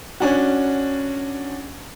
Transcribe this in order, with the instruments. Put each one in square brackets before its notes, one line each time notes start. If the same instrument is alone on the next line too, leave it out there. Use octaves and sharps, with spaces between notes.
[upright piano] C#4 D4 F#4